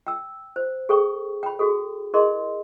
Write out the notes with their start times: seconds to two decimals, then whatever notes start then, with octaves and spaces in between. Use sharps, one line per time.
0.07 G5 E6
0.56 C5
0.89 G#4 A4 G5 C#6
1.43 G5 B5
1.59 F#4 G#4 A4
2.14 E4 G#4 A#4 D#5 C6